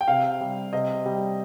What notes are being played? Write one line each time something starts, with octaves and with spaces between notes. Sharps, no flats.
G5
C3 F5
G3
C3 D#5
G3